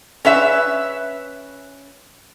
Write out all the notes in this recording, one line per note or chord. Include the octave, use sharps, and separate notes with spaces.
C#4 B4 E5